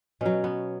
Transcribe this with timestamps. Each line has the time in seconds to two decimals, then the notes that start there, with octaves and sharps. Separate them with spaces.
0.21 B2 F#3 C#4
0.44 B3